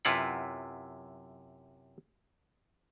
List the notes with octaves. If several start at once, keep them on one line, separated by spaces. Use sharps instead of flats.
F#2 C3 E4 F4 B4 F#5